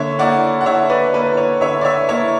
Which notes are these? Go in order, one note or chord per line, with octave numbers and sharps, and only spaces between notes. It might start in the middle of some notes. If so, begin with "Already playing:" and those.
Already playing: D3 A#3 C#5 E5
A#3 E4 D5 F#5
F#5
D3 C#5 E5
B4 D5
A#3 E4 B4
C#5
D3 C#5 E5
D5
C#5 E5
A#3 E4 C#5